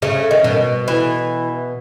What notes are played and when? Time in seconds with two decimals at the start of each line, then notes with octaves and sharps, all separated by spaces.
0.02 C#3 A3
0.31 D#3
0.44 B2
0.88 E3